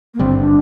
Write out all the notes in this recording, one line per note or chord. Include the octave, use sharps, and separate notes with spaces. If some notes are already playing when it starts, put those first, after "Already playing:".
A#3
G#1 G2 D3 G3 C4
D4